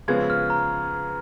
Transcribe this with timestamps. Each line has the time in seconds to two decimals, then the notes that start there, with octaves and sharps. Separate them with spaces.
0.08 C#3 F3 G#3 B3 G#6
0.30 F6
0.50 A#5